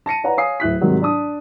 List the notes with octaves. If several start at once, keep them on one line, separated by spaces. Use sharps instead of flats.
A5 A#6 C#7 D#7
B4 C#5 D5 F#5 A#5
C#5 F5 G#5 D#6 C7
D1 E4 F#6 B6
G#2 C3 D#3 F#3 G3
D4 A5 D#6